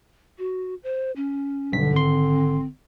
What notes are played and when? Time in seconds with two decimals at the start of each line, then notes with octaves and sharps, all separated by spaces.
0.38 F#4
0.83 C5
1.16 C#4
1.72 B1 G2 D3 B6
1.93 G#1 C4 C6